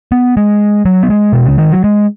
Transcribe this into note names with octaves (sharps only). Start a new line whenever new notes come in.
B3
G#3
F#3
B3
G#3
B2
C#3
D#3
F#3
G#3